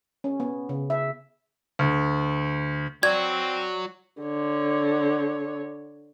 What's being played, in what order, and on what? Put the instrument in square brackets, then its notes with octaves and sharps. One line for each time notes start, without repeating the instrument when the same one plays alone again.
[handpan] C#4
B3
C#3
E5
[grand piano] D2
[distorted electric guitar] F#3 F#4 [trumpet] C4 [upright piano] D5 [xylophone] G#6
[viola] D3 C#5